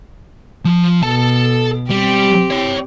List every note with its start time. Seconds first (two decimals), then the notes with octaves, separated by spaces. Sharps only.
0.65 F3
1.03 B2 A4 A5
1.90 G3 C4 G4
2.50 C#5 G5